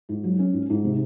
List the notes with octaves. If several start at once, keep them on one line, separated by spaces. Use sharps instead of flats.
G#2
F#3
C#4
G#2
G#2
C3